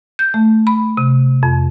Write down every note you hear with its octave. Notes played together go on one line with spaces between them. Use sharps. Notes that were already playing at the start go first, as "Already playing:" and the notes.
G6
A3
B5
C3
F2